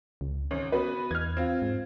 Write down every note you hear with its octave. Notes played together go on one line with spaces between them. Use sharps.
C#2
G#1 C#4
B3 F#4 B4
E2 F6 G#6
C4 F4
G#2